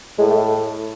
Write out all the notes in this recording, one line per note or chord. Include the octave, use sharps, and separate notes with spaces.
A2 G#3
A3